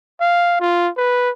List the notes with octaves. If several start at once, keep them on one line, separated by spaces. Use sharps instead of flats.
F5
F4
B4